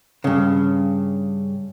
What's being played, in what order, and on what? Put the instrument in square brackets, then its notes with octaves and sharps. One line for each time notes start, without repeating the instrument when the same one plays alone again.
[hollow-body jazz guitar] G2 C#3